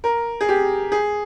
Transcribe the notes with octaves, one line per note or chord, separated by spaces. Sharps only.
A#4
G#4
G4
G#4